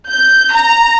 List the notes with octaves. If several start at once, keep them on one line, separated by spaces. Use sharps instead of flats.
G6
A#5